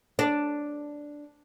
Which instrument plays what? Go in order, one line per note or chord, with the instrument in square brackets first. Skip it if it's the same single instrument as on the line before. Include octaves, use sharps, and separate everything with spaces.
[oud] D4